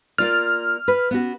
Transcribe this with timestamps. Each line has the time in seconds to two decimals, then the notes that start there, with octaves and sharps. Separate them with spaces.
0.18 A#3 F4 D5 F6
0.88 B4
1.11 B3 C#4 F#4